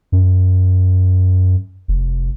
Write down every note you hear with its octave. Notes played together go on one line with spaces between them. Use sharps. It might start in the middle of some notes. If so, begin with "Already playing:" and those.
F#2
F1